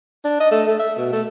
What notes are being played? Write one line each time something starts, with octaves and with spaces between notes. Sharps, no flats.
D4
D#5
A3
A3
E5
B2
A3